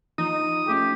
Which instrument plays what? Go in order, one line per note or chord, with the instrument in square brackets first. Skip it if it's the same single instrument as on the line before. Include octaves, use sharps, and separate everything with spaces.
[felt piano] F3 [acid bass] D#4 [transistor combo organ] D#6
[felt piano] A3 C#4 F4 [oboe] G4